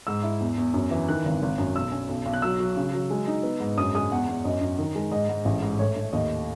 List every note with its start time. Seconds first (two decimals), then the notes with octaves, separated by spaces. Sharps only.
0.07 G#2 E6
0.23 E4
0.40 E2
0.58 E2
0.74 F#2
0.91 E3
1.08 D#3 F#6
1.25 G#1
1.42 G#1
1.58 F#2
1.75 B1 E6
1.92 C#4
2.09 B1
2.26 B1
2.33 F#6
2.42 F#3 E6
2.60 F#3
2.77 C#3
2.94 F#3
3.11 G#3
3.28 D#4
3.43 B3
3.60 G#2
3.77 F#2 D#6
3.95 G#3 D#6
4.11 E2 F#5
4.28 E2
4.44 F#2 D#5
4.61 F#2
4.79 D#3
4.95 G#3
5.12 G#2 D#5
5.29 G#2
5.45 A1
5.62 G#2
5.79 A2 C#5
5.96 A3
6.13 D#2 D#5